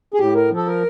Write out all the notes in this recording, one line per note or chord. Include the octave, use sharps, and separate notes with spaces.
G#4
A2 G4
A#4
F3
A4
A#4